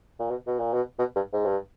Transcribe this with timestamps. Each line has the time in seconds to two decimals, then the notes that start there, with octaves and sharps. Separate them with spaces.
0.20 A#2
0.30 B2
0.47 B2
0.60 A#2
0.73 B2
0.99 B2
1.16 G2
1.33 G#2
1.45 G2